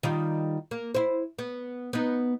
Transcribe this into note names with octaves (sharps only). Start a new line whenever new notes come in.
D#3 G3 F4
A#3
E4 C5
B3
B3 D#4